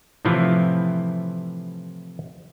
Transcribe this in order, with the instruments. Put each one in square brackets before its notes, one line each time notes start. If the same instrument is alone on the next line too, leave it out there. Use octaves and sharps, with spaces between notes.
[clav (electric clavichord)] A2 C3 E3 F3 E4 F4